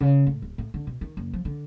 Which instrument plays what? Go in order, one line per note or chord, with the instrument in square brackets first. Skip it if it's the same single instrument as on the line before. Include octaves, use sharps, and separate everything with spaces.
[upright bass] C#3
A2
D1
A2
D3
B2
D#3
F#1
F3
D3